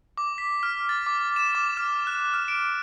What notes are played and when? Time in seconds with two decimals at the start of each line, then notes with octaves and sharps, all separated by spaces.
0.17 D6
0.38 B6
0.63 F6
0.89 A6
1.07 D6
1.36 E7
1.55 D6
1.77 F6
2.07 F#6
2.34 F6
2.48 D7